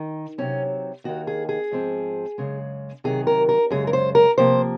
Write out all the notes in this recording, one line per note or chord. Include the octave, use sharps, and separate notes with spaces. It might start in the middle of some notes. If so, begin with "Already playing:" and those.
Already playing: D#3
C3 F#3 C4 C#4
D#2 D#3 A#3 F#4
G#4
G#4
G#2 F3 C4
F#2 C#3 G#3
C3 D#3 F#3 G#4
A#4
A#4
F#2 C#3 G#3 G#4
A#4
C5
A#4
C3 F3 A#3 C5